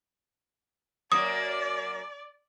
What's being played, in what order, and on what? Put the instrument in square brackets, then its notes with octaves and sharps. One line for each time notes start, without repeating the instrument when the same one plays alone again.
[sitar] F#2 F#3 A#3 [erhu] D5 [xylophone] D#6